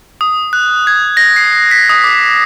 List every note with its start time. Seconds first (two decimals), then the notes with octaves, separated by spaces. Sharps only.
0.21 D#6
0.53 F#6
0.87 G#6
1.17 A#6
1.36 C7
1.71 B6
1.90 D#6
2.04 D6